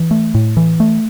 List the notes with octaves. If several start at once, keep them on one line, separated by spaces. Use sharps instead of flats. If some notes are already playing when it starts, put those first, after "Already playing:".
Already playing: E3
A3
A2
E3
A3